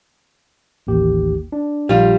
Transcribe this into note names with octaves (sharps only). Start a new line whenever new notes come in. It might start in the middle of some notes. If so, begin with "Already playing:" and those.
A1 D#2 G4
D4
A#1 G3 F4